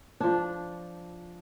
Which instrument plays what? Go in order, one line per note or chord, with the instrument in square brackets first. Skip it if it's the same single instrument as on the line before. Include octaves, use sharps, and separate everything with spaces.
[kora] F3 D4